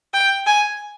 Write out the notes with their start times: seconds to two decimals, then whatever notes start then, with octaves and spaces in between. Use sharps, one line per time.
0.14 G5
0.47 G#5